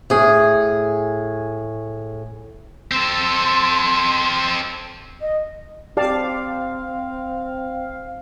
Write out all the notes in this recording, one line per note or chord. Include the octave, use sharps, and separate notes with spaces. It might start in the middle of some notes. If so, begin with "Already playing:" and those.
A2 G#4
C4 A4 C6
D#5
C4 G4 D5 F5 A5